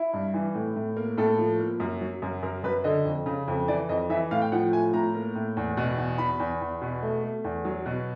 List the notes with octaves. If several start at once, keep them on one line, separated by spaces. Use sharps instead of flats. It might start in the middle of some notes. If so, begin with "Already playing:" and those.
Already playing: E4
G2
E3
A2
A2
A#3
A2 A4
F3
A#3
F#2
F#3
F#2
F#2 A#4
F#2 B4
D3 D#5
F2
C#3
F2
E3 D5
F2 D#5
E3 E5
A2 F5
G5
F3 F#5
A2 G#5
A2 A#5
A#3
A2
E2
B2
E2
E2 B5
E2
E2
B2
A3
A3
E2
F#3
B2